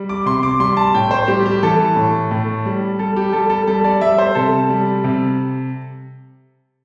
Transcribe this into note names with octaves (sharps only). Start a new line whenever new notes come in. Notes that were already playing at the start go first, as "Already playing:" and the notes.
Already playing: G3
D6
C3 C6
D6
G3 C6
A5
A2 G5
C5
G3 G4
G4
E3 A4
A2
A2
G3
G3 A4
G4
G3 A4
A4
G3 A4
D5
G3 E5
C5
C3 A4
G3
C3